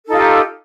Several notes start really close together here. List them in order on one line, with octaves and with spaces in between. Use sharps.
A4 D#4 F4 G4